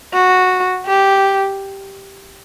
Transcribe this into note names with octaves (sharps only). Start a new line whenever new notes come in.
F#4
G4